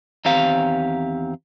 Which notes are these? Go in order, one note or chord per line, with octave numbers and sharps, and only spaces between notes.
E2 D#3 C4 G4 F5 A#5